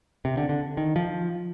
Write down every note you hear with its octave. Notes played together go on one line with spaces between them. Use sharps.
C3
D3
D3
D#3
F3